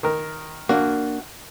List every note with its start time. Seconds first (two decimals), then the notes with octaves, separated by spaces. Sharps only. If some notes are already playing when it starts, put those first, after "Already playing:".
0.03 D#3 A#4
0.69 A#3 D4 F#4